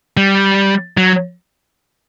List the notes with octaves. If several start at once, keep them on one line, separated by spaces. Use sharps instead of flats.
G3
F#3